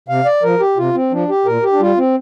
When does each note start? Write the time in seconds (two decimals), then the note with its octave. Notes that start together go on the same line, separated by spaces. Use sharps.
0.08 C3 F5
0.25 D5
0.43 F3 A#4
0.60 G4
0.77 C3 F4
0.94 C4
1.12 F3 D4
1.29 G4
1.45 A#2 A#4
1.63 G4
1.73 D4
1.80 G3 F4
1.98 C4